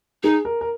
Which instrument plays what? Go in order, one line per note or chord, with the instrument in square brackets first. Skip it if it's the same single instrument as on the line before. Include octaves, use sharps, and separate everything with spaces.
[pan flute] D#4 [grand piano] G#4
[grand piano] A#4
A#4